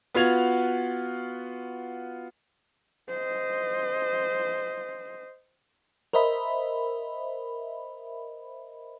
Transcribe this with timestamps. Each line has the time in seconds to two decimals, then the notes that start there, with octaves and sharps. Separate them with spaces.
0.14 B3 F4 F#4 G#6 F7
3.09 C5 D#5
6.13 A#4 C5 D#5 E5 B5